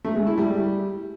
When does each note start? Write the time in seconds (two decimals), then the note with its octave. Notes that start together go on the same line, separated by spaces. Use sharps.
0.05 A3
0.16 G#3
0.27 E4
0.38 G3